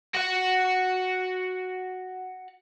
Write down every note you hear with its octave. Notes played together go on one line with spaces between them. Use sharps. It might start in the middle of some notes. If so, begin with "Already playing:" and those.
F#4 F#5